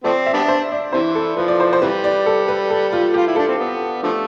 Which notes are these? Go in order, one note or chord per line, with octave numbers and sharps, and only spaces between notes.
F3 A3 C4 D5
E5
G3 B3 D4
C5
D5
C3 E3 C5
A4
F3 B4
D5
C5
C5
C3 E3 G3 B4
D5
A4
B4
A4
F4
F4 G4
E4
D4 A4
C4
B3
D3 F3 A3